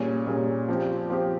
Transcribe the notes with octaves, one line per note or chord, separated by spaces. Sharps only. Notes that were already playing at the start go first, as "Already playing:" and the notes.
Already playing: A#2 G3 C#4 G#4
A#2 G3 C#4 G#4
F3 C4 G4
F3 C4 G4